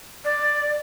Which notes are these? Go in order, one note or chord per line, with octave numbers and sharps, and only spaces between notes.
D5